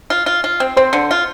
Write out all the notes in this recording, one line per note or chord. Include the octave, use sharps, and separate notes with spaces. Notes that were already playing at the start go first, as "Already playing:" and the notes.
F4
F4
F4
C4
C4 C5
D3
F4